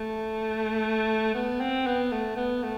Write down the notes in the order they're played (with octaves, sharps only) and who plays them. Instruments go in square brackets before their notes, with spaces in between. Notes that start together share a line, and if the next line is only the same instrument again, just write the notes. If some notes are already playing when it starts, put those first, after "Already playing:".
Already playing: [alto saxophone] A3
B3
C4
B3
A3
B3
A3